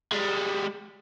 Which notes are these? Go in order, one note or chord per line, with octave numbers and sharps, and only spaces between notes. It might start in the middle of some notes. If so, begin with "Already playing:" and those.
G3 G#3